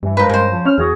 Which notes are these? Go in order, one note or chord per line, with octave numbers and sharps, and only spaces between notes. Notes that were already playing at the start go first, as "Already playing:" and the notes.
G2 E3
F3 G#3 D#4 A#4 B4
G2 C#3 C5
F3
C#4 F6
E2 F#4 G#4